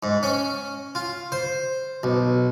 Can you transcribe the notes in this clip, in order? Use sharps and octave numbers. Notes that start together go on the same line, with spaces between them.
G#2
C#4
F4
C5
B1